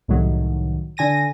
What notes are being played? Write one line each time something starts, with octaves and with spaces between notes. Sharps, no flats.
C2 A2 D#3 F#3
D3 G#5 A#6 D#7